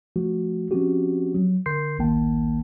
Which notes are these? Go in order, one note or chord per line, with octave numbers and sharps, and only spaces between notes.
F3 A3 F#4
F3 C4 C#4 F#4 G4
F#3
D3 A#4 C6 G6 C7
A1 D2 D#3 A#3 G5 A5